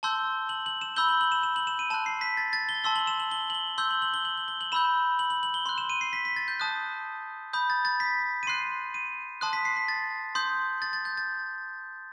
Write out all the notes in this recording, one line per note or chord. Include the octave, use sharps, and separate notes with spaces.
A5 C6 E6 G6 G7
F#7
F#7
E7
B5 E6 G6 G7
F#7
F#7
E7
E7
F#7
E7
D#7
A5 C6 F#6 E7
C7
B6
A6
A6
G7
A5 C6 E6 G7
F#7
E7
F#7
G7
F#7
G7
C6 E6 G6 G7
F#7
F#7
G7
F#7
F#7
G7
F#7
B5 E6 G6 E7
F#7
F#7
F#7
G7
C6 F#6 F#7
E7
D#7
C7
B6
B6
A6
G6
A5 D#6 F#6
B5 D#6 G6
A6
A6
B6
D#7
C6 F#6 C7
D#7
A5 C6 D#6 F#6
B6
C7
B6
A6
C6 D#6 G6
A6
A6
G6
A6